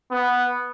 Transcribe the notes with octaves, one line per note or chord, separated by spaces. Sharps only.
B3